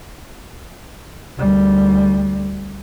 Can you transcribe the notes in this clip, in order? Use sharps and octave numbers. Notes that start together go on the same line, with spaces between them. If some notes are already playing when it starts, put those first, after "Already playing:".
D2 G3